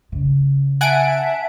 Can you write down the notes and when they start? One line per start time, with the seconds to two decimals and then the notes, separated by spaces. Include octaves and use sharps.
0.12 C#3
0.81 E5 F#5 G#5 A5 D7